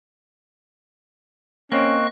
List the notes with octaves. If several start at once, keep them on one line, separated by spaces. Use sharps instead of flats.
A#3 C4 C#4 D#5 C#6 F#6